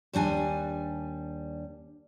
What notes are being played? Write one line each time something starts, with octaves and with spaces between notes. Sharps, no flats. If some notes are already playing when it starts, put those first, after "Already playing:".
D#2 G3 D4 G#5